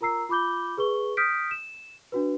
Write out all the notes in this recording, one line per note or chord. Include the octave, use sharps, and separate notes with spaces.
F4 A#4 A#5 E6 C7
F4 B5 D6 G6 G7
G#4 B4 C#6 G7
D#6 F6 G6 B6 D7
E7
D4 F#4 B4